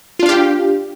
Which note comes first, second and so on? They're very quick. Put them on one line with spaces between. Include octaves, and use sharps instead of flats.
F4 D4 F5 G4